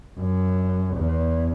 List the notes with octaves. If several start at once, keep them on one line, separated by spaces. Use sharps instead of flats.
F#2
E2